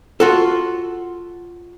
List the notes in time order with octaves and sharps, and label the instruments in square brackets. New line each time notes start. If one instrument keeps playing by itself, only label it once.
[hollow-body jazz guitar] F4 F#4 A4